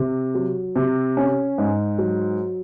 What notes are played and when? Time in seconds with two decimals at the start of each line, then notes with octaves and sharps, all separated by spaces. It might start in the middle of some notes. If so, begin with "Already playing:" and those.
Already playing: C3
0.35 F#3
0.76 C3
1.17 C#4
1.58 G#2
1.99 F#3